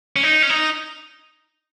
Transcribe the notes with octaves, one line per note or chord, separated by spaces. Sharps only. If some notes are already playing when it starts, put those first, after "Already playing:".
C#4
D#4
C#4
D#4